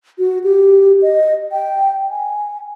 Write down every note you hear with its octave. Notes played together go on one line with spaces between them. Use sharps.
F#4
G4
D#5
G5
G#5